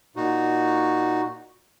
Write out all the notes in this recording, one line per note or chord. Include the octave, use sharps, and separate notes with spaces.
A#2 D#4 F#4